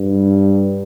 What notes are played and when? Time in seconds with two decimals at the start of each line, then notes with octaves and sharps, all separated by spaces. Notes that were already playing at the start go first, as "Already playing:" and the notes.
Already playing: G2